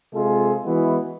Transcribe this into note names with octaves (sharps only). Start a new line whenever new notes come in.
C3 G#3 F4 G#4 A4
E3 G#3 B3 E4 F#4